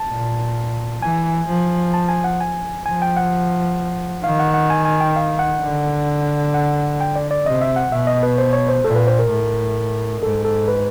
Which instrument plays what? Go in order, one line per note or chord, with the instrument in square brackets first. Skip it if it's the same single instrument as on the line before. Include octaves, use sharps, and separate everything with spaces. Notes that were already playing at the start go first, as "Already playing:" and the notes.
Already playing: [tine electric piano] A5
[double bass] A#2
[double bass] E3 [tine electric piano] G#5
[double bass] F3
[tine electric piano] A5
G#5
F#5
G#5
[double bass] F3 [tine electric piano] G#5
[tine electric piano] G5
F#5
[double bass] D#3 [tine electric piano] F5
[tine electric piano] F#5
F#5
G#5
G#5
G5
F5
F#5
[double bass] D3
[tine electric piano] F#5
G5
D5
D5
[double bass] C3 [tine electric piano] D#5
[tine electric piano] E5
F#5
[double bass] B2 [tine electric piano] E5
[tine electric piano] D#5
B4
C5
C#5
C5
[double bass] A#2 [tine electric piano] A4
[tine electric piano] B4
C5
A#4
[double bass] A2
[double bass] G#2 [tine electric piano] A4
[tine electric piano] A4
B4